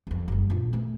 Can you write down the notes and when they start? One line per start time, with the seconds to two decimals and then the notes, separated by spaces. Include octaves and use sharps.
0.07 F2 B3
0.28 F#1 G3
0.50 A#1 F4
0.73 A3 C4